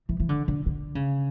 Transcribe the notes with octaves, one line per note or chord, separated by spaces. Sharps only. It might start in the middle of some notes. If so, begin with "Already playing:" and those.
E3
E3
D3
D3
D3
C#3